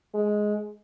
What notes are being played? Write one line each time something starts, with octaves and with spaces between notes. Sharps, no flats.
G#3